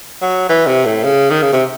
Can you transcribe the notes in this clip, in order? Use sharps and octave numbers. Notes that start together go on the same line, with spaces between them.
F#3
E3
C3
A2
C#3
D#3
C#3
C3